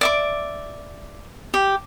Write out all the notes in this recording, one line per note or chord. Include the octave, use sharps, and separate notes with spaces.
D5 E5 D6
G4